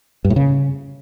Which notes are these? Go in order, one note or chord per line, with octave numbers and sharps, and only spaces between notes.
G2
A2
C#3